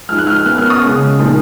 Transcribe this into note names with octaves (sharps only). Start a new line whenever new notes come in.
F3 G#3 D#4 F6
F#6
F6
B2 A#3 C#4 F#6
F6
D#6
C#3 G#3 C#4
A#2 F3 G#3 D#4